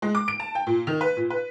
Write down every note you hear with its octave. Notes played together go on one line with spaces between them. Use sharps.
G#3
D6
D7
A5
G5
A#2
D#3
B4
A#2
B4